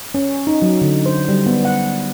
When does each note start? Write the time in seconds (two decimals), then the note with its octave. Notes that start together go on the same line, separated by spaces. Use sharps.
0.14 C#4
0.47 D#4
0.62 F#3
0.81 D3
1.06 C5
1.28 G3
1.46 B3
1.65 F#5